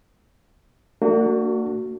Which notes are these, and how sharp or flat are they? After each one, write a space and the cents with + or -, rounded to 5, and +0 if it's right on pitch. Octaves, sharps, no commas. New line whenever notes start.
A#3 -40 D4 +0 F#4 +0